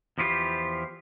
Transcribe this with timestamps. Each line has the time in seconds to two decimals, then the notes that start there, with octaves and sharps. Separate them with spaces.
0.18 E2 F3 E4 F4 G4 C5